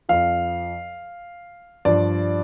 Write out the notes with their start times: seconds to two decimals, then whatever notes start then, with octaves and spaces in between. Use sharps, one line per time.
0.09 F2 F3 F5
1.85 G2 F3 D5